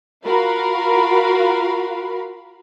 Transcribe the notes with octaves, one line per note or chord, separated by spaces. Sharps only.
F4 F#4 A#4 F5 B5